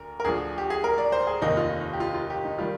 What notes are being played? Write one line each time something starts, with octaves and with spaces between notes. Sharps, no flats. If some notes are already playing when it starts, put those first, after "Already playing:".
Already playing: D2 A#4
A#4
D2 D3 F3 G#4
G4
G#4
A#4
D5
C5
G#4
F1 D#2 D#3 D#4
F4
G4
F4
F4
G4
D#4
D#3 G3 F4